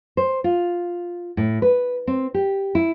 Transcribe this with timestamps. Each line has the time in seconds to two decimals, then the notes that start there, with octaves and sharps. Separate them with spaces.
0.17 C5
0.44 F4
1.37 A2
1.62 B4
2.07 C4
2.34 G4
2.75 E4